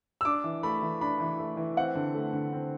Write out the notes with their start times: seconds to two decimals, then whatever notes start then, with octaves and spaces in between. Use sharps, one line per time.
0.21 E6
0.25 D4 D6
0.44 E3
0.63 A3 B5
0.82 E3
1.01 D4 B5
1.20 E3
1.39 A3
1.57 E3
1.77 C4 F#5
1.95 D3
2.15 A3
2.33 D3
2.53 C4